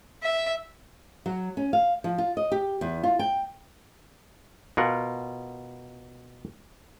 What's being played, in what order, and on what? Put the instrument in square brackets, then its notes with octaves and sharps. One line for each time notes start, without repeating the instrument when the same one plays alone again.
[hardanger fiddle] E5
[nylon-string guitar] F#3
C#4
F5
F3
F4
D#5
G4
E2
F4
G5
[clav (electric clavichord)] B2 F4 A#4 F#5